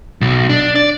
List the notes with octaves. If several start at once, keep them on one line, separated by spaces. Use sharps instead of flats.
B1
D4
D5